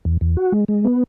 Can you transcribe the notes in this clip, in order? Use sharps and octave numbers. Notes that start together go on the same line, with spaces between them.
E2
E2
F#4
G#3
G#3
B3